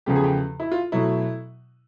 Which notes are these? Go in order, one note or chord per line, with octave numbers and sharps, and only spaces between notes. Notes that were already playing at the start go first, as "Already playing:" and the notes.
E2 C#3 F3 A3 G4
G#4
G4
E4
F4
B2 F#3 A3 E4